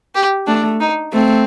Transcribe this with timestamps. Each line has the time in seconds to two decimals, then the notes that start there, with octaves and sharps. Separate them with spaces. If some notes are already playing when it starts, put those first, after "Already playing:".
0.15 G4
0.47 A3 D4
0.80 D#4
1.13 A3 C4